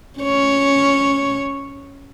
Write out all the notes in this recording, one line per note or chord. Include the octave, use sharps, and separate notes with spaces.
C#4 C#5